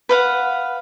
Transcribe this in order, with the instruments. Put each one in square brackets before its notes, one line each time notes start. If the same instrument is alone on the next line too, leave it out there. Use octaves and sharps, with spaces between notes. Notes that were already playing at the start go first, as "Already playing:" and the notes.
[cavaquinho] B4 F5 F#5